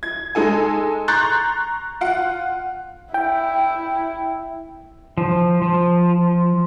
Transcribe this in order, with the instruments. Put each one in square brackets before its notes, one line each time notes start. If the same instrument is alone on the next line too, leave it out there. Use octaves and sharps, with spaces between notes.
[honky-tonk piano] G#6
G#3 D#4 A4 G#5
A#5 C6 C#6 F#6 G6 A6
F4 F#5
[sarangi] E4 [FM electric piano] G5
[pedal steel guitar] F3
F3